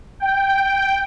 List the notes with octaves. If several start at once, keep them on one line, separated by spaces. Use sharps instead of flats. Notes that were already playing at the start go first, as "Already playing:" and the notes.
G5